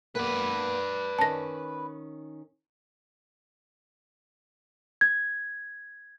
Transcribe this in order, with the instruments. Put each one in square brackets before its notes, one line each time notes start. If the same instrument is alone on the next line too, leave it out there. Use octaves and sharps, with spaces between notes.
[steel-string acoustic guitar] A#3 B3 [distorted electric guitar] B4 D5
[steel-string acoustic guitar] D#3 C#4 [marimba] A5 A#6
[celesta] G#6